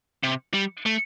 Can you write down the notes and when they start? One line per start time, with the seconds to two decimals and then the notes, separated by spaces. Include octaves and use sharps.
0.23 C3
0.54 G3
0.86 A3